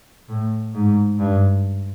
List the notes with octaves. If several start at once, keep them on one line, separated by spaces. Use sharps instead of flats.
A2
G#2
G2